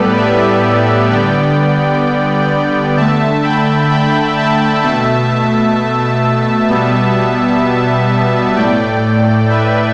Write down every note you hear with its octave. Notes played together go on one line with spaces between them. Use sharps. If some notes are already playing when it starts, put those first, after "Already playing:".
Already playing: A2 G3 B3 G4 A4 B4 D5
B4 E5
D3 G3 B3 D5 G5
D3 A3 E5 A5
G5 B5
G5 B5
E5 A5
B2 A3 E5 A5
B2 G3 B3
A2 A3 D5 G5
B4 E5